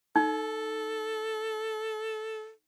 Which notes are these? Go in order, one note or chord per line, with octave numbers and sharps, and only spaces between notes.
D#4 A4